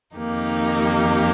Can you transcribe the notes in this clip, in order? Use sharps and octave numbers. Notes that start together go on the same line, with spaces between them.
F2 D#3 A#3 D#4 G4